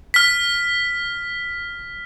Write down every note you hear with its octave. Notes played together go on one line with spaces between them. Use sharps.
F6 B6